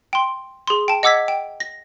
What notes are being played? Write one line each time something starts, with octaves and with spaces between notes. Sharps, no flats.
G5 C6
G#4 C6
G5 A5
D#5 F#5 D6 E6 G#6 B6
G5
A#6